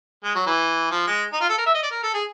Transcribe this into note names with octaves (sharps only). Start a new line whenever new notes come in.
G#3
F#3
E3
F3
G#3
D#4
F4
A4
A#4
E5
D#5
D5
A#4
A4
G#4